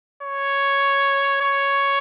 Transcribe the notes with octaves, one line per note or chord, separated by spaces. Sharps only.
C#5
C#5